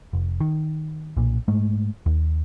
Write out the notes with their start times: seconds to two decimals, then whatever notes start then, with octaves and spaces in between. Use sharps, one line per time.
0.13 F1
0.40 D#3
1.17 B1 A#2
1.48 G#2 G#3 A3
2.06 D#2